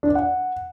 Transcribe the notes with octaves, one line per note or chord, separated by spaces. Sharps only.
D4
D5
F#5